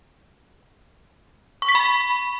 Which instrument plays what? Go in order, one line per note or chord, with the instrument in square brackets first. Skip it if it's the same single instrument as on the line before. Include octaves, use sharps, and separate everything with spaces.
[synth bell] C#6
B6
B5